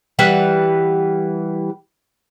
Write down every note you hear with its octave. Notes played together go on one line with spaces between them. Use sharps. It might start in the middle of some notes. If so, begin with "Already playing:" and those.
E3 G3 B4 F#5